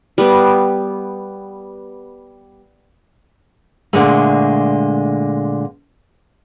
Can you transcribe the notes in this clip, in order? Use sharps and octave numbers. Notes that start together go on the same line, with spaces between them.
G3 B3
A#2 D3 G#3 A3